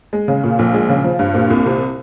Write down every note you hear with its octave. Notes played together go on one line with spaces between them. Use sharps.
G#3
C#3
A#2
A#1
G#3
C#3
F3
G2
A#2
C2
C3